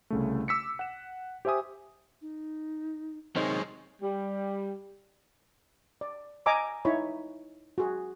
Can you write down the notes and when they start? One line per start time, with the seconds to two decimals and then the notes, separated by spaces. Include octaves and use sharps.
0.10 C2 C#3 A3
0.48 D6 E6 B6 C#7
0.79 F#5 E7
1.45 G4 C5 E5 G#5 D#6
2.22 D#4
3.36 F#2 C3 D#3 G#3 D#4 C5 C#5
4.02 G3
6.01 D5
6.46 D#5 G#5 A#5 D6 E6
6.85 D#4 E4 C#5 B5
7.78 F#4 G#4